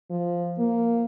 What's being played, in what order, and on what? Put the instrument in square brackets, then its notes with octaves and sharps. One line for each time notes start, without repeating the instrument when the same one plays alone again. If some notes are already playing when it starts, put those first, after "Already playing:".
[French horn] F3
A#3